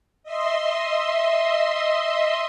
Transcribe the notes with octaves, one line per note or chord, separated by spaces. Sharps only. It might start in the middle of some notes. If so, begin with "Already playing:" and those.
D#5 E5 C6